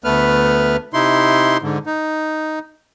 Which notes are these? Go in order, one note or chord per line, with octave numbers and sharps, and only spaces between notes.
D2 A3 B3 B4 F6
C3 D#4 E4 C6
G#2 D3
D#4